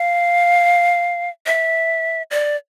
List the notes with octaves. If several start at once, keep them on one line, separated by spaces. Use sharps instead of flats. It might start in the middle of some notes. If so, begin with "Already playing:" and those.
Already playing: F5
E5
D5